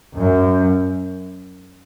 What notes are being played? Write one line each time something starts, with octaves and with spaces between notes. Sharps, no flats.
F#2